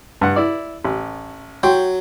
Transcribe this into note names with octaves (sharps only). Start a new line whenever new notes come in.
G2 F#5
E4 D5
A1
F#3 G5 C6